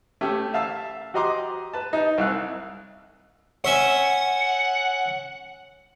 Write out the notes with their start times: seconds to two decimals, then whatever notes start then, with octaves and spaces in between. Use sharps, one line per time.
0.21 A3 C#4 G4
0.54 E5 F5 A5 E6
1.14 F#4 G4 D#5 A#5 C6 D6
1.74 B4 A5
1.93 D#4
2.18 C2 E5 F5 E6 F#6
3.64 C#4 C#5 E5 F#5 C6